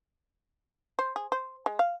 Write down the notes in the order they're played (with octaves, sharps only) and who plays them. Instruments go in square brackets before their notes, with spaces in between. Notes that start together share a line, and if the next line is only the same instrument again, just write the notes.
[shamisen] C5
G#4
C5
G#3
F5